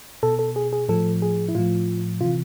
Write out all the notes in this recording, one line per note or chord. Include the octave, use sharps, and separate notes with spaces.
B2 A4
A4
G#4
G#4
A2 F3 A4
G#4
E4
A2 F3 F4
C3 E3 F4